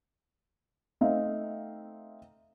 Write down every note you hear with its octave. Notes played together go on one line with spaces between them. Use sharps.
A3 C4 D#4 E5 F5